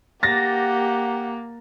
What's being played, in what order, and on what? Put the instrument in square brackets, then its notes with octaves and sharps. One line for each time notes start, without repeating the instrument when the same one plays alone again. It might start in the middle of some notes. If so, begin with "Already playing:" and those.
[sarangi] A#3 [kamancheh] G4 F#5 [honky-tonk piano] A6 A#6